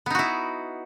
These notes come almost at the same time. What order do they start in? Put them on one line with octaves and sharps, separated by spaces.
B3 D#4 F#4 E4